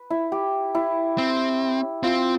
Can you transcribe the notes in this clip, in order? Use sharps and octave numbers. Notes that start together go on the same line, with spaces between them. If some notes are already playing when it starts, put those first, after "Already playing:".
Already playing: B4
E4
G4
E4
C4
C4 F4